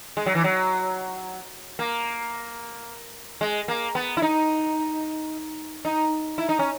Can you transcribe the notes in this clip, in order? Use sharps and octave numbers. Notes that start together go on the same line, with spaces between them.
G#3
F#3
E3
F#3
A#3
G#3
A#3
B3
E4
D#4
D#4
E4
D#4
C#4